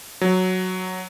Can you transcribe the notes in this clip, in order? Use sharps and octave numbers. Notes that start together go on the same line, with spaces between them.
F#3